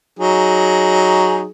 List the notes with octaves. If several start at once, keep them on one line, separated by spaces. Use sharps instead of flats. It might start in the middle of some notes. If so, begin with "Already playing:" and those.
F#3 D#4 G#4